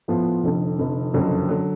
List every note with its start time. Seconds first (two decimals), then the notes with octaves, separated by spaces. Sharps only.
0.08 A2 F3 B3 F4
0.43 F1 F2 D3
0.79 F1 F2 D3
1.14 F#1 F2 D3 F#3
1.49 D3 F#3